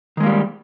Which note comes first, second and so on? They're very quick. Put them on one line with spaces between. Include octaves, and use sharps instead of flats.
D#3 G#3 A#3 G3